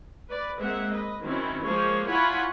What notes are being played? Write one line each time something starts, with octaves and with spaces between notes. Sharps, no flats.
B4 D5
G#3 A#3 C4 E5 F#5
B4 D#5
D#3 F#3 C4 C#4 E4
F3 G#3 A#3 G#4 C5 C#5
E4 F4 C#5 F#5 G#5 B5